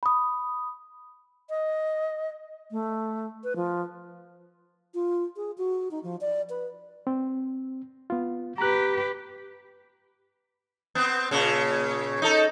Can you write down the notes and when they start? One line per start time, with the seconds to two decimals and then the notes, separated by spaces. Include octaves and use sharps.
0.03 B5 D#6
1.50 D#5
2.71 A3
3.44 B4
3.56 F3
4.94 F4
5.36 G#4
5.58 F#4
5.91 D#4
6.03 F3
6.21 D5
6.49 B4
7.07 C4
8.10 B3 F4
8.58 G4 B4 A#5 F#6
10.95 B3 C4
11.31 A#2 C#3
12.22 D#4 A4